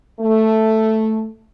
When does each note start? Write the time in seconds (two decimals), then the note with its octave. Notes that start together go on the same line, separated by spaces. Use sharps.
0.20 A3